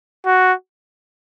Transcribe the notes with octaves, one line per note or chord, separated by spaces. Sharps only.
F#4